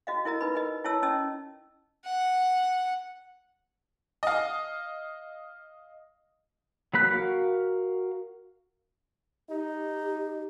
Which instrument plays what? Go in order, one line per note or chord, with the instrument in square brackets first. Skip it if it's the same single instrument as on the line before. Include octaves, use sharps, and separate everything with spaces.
[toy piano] F#4 D#5 F5
E4 A#4 D#5 A#5
D#4 B4 B5
D#4 A#4 D#5
E4 F4 C#5 A5 E6
C#4 D#5 A5 E6
[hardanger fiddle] F#5
[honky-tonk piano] D#5 F5
[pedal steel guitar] F#3 A#3 B5 F#6
F#4 A#4 F5
[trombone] D#4 [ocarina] G4